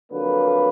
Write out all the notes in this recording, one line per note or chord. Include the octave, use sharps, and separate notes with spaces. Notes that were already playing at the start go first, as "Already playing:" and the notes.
F2 D3 F#3 A#3 B4